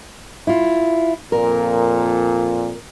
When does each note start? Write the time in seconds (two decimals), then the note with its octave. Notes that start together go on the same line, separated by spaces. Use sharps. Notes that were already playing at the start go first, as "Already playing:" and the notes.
0.47 E4 F4
1.32 F2 A#2 A#4